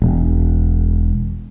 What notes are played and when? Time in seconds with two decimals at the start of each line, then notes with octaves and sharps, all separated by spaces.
0.02 E1